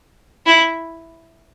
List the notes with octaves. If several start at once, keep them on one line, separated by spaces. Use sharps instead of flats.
E4